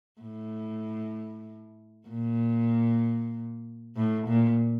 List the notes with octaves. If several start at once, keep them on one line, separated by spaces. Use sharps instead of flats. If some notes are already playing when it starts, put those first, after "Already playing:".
A2
A#2
A2
A#2